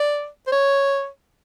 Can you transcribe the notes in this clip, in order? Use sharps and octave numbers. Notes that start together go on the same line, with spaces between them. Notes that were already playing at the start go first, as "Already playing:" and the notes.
Already playing: D5
C5
C#5